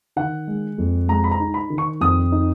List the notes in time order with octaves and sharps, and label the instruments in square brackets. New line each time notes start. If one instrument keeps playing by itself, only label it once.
[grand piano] D#3 [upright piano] F#5
[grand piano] G#3
F2
[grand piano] G#3 [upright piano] A#5
[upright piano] B5
A#5
[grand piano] D#4
[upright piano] B5
[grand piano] D#3
[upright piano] C#6
[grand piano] F2 [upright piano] D#6
[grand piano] D#4